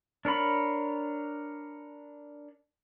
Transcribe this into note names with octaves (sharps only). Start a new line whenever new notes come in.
D4 A#4 C#5 B5